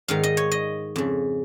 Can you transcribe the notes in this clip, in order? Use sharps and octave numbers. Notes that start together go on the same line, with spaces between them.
G#2 D#3 F5
D#5
C#5
D#5
F2 C#3